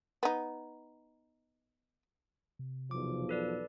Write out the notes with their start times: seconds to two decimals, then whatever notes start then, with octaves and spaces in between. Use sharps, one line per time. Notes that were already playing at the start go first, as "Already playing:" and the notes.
0.23 B3 D#4
2.59 C3
2.91 B1 E2 F3 D6
3.29 A4 B4 D5